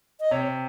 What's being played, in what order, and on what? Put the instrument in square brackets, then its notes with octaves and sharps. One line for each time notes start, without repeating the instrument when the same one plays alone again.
[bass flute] D#5
[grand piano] C3 [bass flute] C#5